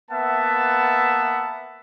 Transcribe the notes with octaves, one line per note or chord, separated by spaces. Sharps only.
A#3 B3 B4 E5 F#5 A5